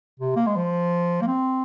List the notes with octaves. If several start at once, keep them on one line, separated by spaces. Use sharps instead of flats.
C3
A#3
G#3
F3
A#3
C4